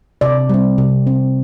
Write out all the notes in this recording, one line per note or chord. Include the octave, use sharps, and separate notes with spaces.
C3 D5
G3 C4
C3
G3 C4